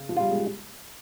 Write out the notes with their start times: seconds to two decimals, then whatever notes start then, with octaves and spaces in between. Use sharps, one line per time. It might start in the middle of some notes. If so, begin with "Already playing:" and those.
Already playing: C#3
0.09 F3
0.17 G3 F4
0.31 G#3